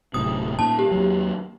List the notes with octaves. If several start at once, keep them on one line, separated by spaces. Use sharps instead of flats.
D1 A2 C3 D#6
A#2 D#3 A5
G4
D#2 F#3